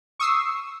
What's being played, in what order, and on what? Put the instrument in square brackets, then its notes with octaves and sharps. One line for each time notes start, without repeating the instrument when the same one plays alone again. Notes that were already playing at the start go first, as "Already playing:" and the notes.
[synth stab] C#6 D#6 E6 C7